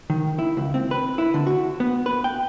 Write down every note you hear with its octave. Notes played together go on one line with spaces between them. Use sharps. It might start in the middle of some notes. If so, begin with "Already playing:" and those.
D#3
E4
C#2
C4
B4
E4
D3
F#4
B3
B4
G5